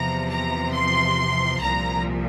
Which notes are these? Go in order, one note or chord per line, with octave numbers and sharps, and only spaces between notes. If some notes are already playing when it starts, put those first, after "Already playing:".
Already playing: E2 C3 F3 A#5
A#5
C6
C2 A#2 F3 A#5